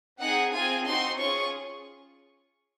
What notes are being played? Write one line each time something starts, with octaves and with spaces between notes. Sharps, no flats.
C4 D#4 G#4 F#5
C4 F4 G#4 G#5
C4 D#4 F#4 C6
C#4 F4 G#4 C#6